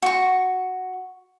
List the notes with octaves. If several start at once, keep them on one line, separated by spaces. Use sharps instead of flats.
F#4 C#6